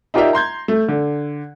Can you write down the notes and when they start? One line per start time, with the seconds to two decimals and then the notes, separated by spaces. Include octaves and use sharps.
0.14 D#4 F4 G4 A#4 D5 E5
0.33 A#5 C6 G6 G#6
0.68 A3
0.88 D3